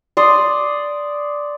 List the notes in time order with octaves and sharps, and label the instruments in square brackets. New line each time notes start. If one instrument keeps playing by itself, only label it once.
[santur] D5 C6 D#6